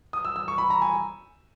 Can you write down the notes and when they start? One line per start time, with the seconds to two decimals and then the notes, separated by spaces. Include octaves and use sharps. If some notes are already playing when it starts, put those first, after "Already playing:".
0.13 D#6
0.25 E6
0.36 E6
0.48 C#6
0.58 B5
0.70 A#5
0.82 G#5